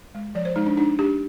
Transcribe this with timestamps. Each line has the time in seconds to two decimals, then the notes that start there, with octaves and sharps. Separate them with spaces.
0.15 G#3
0.35 F3 D5
0.45 C5
0.56 G#3 D#4
0.66 D4
0.77 D4 D#4
0.99 D4 G4